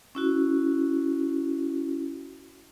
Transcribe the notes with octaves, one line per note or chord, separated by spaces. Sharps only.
C#4 E4 F#4